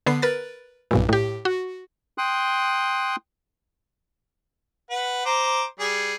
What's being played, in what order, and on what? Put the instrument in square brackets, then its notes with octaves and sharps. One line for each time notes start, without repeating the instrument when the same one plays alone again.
[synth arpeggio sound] D3 B3 C7
A#4 B4 A6
B1 G2 A#2
A2 G4
F#4
[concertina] G5 C6 D#6 F#6
[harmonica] B4 F#5
C5 A#5 D6
G3 G#4